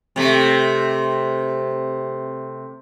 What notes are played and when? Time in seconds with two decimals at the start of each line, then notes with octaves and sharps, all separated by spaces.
0.16 C3 A3